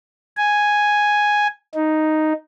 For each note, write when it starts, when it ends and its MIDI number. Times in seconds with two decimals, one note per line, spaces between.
0.37 1.47 80
1.74 2.32 63